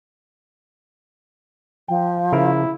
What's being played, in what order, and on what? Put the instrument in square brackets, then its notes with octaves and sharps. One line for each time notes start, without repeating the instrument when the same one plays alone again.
[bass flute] F3 [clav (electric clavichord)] G5
[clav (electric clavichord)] C#3 A#4 [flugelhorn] E4